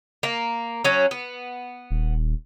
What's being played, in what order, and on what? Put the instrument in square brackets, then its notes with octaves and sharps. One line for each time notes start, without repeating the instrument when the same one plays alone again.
[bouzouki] A#3
F#3 C#4
B3
[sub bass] D#1